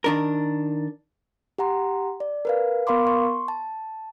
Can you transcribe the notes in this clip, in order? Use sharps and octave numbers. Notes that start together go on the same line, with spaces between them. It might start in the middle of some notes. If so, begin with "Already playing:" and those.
D#3 D4 A#4
G4 F#5 A#5 C6
D5
A#4 B4 F5
B3 A#4 F5 B5 C6 D6
C6 C#6
A5